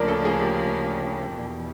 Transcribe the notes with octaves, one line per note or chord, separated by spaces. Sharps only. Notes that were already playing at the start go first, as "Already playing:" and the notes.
Already playing: D2 C#3 F3 A#3 D4 A#4 D5
A4
G#4
G4
E2 B2